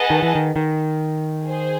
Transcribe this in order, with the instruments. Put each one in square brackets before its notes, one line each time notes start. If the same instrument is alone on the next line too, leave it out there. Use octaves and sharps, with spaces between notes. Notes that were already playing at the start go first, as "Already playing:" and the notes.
Already playing: [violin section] G#4 B4 D#5 F#5 A5
[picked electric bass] D#3
E3
D#3
D#3
[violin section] G#4 C5